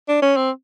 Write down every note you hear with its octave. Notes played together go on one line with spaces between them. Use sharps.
D4
C#4
C4